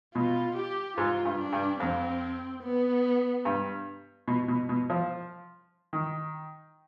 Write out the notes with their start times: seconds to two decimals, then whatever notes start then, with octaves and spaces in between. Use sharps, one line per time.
0.15 B2 F4
0.56 G4
0.97 G#2 F4
1.25 G2
1.39 D4
1.53 G2
1.80 F2 C4
2.63 B3
3.45 G2
4.28 B2
4.48 B2
4.69 B2
4.90 F3
5.93 D#3